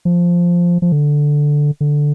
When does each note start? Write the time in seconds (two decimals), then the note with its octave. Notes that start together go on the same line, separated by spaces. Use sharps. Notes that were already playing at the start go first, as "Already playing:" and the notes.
0.05 F3
0.82 F3
0.92 D3
1.81 D3